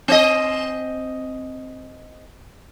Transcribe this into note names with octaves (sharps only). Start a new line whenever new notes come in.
C4 D#5